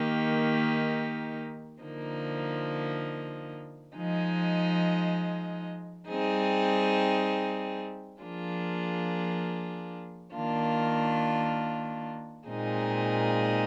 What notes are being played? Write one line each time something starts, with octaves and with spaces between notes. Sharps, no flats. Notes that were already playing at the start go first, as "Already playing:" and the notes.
Already playing: D#3 A#3 D#4 G4
D3 F3 A#3 D#4
F3 G#3 D#4
G3 C4 D#4 G#4
F3 A#3 D4 F4 G#4
D#3 A#3 D4 F4
A#2 G#3 C4 D#4 G#4